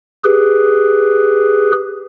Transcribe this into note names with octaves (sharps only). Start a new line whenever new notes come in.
G4 G#4 B4